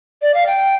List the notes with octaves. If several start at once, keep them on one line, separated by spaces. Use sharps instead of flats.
D5
F5
G5